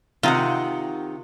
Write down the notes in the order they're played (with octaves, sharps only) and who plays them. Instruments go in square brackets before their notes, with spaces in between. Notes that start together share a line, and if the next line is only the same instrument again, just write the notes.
[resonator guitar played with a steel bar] C3 D#3 F#5 [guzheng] F4